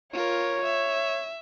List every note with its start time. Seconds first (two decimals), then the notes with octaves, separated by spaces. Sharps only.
0.13 F4 A#4 C#5
0.65 E5